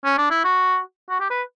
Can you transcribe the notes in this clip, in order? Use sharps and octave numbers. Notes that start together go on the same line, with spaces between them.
C#4
D4
E4
F#4
F#4
G4
B4